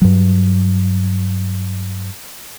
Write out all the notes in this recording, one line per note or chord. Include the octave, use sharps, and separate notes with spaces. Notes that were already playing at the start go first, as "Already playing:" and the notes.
G2 F#3